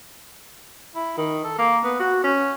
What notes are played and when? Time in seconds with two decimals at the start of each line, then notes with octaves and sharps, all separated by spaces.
0.95 E4
1.18 D#3
1.44 A4
1.58 A#3
1.84 B3
1.99 F#4
2.23 C#4